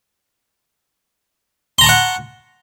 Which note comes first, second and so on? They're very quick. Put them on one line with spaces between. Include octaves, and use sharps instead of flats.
C6 A#5 A5 C#6 F#5